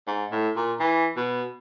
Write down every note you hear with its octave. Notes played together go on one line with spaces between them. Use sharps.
G#2
A2
A#2
E3
B2